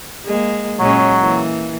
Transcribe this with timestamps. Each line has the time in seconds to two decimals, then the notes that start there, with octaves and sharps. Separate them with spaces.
0.25 G#3 A#3
0.79 A#2 F#3 G#3 C#4
1.18 E3 A#3